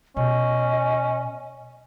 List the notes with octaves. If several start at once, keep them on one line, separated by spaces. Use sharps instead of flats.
B2 C#4 D#5